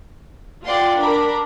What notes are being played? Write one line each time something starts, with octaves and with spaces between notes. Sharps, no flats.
F4 D5 F#5 G5 C6
D4 A#4 B5